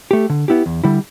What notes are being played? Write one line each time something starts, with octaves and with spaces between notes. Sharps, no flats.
A3 G4
D3
B3 E4 G4
E2
D3 G3 E4